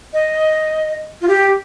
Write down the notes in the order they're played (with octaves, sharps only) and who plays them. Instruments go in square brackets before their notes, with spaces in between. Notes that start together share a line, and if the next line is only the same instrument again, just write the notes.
[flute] D#5
F4
G4